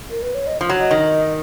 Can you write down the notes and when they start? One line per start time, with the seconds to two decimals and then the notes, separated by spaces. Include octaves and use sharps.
0.10 A#4
0.22 B4
0.35 C#5
0.47 D#5
0.61 F3
0.70 F#3
0.80 D#5
0.91 D#3